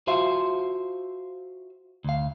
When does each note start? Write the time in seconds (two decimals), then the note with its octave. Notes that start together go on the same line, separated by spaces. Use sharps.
0.07 F4 F#4 C5 E5 F5
2.04 D2 F5